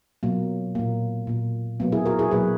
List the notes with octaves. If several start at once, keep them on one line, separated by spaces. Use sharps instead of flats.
B2 F#3 A#3
A#2 A#3
A#2 A#3
B2 F#3 A#3 B3
E4 G#4
F#4 A#4
E4 G#4
B2 F#3 A#3 G#4 B4